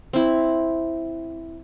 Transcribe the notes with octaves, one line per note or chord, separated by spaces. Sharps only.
C4 E4